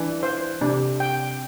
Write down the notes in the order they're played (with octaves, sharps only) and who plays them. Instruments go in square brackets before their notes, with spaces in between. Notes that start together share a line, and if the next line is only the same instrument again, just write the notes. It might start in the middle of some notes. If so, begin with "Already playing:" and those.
Already playing: [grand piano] E3 [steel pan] D4
[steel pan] C5
[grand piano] C3 [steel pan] D4
[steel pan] G5